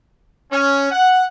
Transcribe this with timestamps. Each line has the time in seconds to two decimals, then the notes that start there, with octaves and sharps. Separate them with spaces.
0.52 C#4
0.91 F#5